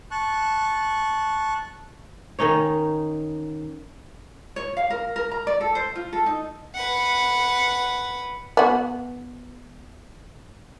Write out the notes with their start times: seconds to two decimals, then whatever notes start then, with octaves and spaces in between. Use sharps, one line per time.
0.11 A5 C#6 F#6
2.39 D#3 C#4 D#4 C#5
4.56 C#5
4.77 F5
4.90 A#4
5.16 A#4
5.31 A#5
5.47 D5
5.61 A4
5.75 C5
5.95 F4
6.13 A4
6.26 D#4
6.75 B4 F#5
8.57 B3 F#4